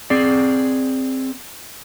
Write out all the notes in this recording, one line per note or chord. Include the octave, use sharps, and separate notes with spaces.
C4 G#4 D5